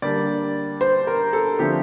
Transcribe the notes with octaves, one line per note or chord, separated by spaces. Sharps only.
D3 G3 A#3 D4 D5
C5
A#4
A4
D3 F3 A3 C4 G4